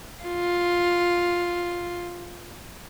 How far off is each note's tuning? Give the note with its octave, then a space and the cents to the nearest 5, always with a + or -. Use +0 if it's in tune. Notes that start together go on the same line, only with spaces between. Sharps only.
F4 +5